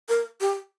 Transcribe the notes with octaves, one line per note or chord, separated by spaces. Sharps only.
A#4
G4